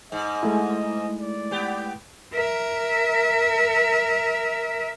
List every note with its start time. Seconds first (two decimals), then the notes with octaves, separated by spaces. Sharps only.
0.12 G#2 D#5
0.43 G#3 A3 E4
1.21 D5
1.51 B3 G4
2.35 A#4 E5